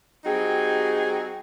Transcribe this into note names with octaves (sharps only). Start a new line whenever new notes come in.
G3 C4 D#4 F#4 G#4